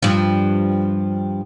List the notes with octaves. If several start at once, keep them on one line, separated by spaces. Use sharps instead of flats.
G2 F3